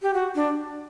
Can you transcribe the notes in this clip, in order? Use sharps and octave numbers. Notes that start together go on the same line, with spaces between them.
G4
F#4
D4